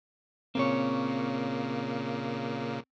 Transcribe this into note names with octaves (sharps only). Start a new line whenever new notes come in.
A#2 C#3 A#3 C4 C#5